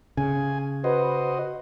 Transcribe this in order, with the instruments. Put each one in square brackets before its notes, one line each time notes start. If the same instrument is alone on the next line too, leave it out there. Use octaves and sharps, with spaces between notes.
[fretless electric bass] C#3 [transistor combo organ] G#5
[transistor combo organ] F#4 C5 D#5 [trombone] B4